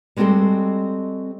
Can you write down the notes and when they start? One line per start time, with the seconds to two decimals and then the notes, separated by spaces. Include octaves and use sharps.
0.16 G3 G#3 C4 F#4 G4 A4